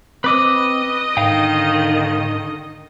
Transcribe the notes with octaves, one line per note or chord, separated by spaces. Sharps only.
C4 B4 D#5 D6 E6
G#2 D3 D#3 F5 G5